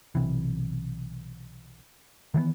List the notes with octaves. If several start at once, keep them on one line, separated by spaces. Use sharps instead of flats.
B1 C3 E3
D#3 E3 G3 B3